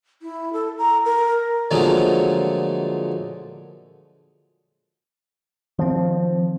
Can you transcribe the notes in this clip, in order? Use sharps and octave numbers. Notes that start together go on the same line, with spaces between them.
E4
A4
A#5
A#4
A#2 D3 F3 F#3 G#3 A3
D#3 F3 C4